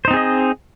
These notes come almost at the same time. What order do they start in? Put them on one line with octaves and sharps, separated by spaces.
C5 D#4 C4 G#4 D#5